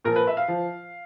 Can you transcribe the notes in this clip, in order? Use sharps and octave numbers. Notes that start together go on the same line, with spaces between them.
A#2 F3 A#4
B4
E5
F5
F3